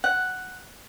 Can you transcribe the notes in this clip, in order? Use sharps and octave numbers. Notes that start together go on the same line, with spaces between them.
F#5